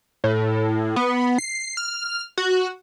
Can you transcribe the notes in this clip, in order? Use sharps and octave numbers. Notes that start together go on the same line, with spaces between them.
A2
B3
C7
F6
F#4